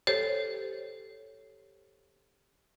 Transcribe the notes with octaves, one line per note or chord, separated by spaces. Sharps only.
G4 A4 C5 C#5